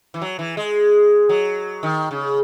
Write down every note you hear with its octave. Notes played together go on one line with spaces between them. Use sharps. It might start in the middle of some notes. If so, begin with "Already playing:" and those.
E3
F#3
E3
G#3
F#3
D#3
C#3